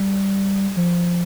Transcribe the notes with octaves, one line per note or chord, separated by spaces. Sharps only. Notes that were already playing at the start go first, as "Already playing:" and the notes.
Already playing: G3
F3